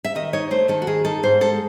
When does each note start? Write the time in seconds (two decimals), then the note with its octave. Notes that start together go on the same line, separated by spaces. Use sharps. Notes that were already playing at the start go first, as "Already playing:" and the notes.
0.04 E5
0.15 D#3 D#5
0.33 D#4 C#5
0.51 A3 C5
0.68 D#3 A4
0.82 F#4
0.87 D#3 G#4
1.05 D#4 A4
1.23 G#2 C5
1.41 G#3 A4